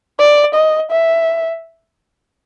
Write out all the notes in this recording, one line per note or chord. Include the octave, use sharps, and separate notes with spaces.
D5
D#5
E5